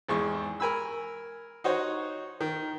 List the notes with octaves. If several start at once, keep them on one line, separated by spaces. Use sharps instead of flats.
G#1 E2 G#3 C#6
A#4 G#5 B5 E6
D#4 F#4 C5 C#5
D#3